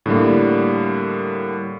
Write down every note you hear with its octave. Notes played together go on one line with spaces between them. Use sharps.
A2 D3 G3 A#3